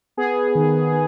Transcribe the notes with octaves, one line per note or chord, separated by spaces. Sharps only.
B3 G#4
D#3
B3